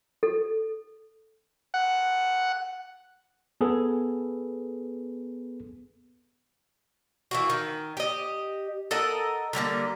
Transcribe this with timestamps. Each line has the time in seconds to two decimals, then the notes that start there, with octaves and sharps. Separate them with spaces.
0.23 A4
1.74 F#5
3.61 B3 G#4 A4 B4
7.31 E3 A#3 F#4
7.50 D#3
7.97 G4 D#5
8.91 A4 A#4 D#5 F#5
9.53 D3 G3 G#3 A#3